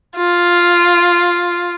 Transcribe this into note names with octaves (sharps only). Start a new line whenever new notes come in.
F4